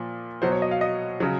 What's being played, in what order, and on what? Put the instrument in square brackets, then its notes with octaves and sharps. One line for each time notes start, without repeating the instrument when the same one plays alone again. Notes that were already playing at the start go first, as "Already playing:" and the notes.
Already playing: [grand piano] A#2 F3
B2 F#3 C5
C#5
D#5
F5
D#5
C#3 F#3